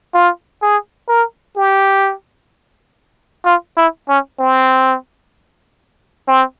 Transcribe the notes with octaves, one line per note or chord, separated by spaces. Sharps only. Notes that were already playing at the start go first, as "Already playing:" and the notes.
F4
G#4
A#4
G4
F4
E4
C#4
C4
C4